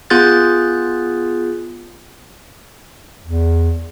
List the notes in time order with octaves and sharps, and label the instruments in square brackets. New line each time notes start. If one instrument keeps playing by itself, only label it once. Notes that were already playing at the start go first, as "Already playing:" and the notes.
[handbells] B3 F4 G#4 F#6 G6 A6
[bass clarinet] E2